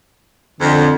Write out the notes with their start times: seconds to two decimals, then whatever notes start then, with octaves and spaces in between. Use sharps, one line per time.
0.61 F2 D3